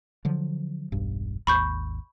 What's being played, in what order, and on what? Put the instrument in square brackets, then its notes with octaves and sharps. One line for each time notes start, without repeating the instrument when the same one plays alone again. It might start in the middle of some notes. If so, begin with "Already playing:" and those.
[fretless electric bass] D3 F3 F#3
E1 B1 G2
[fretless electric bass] G#1 D#2 [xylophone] B5 C#6 G6